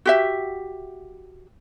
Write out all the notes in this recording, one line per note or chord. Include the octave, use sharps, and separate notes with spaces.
F#4 G4 E5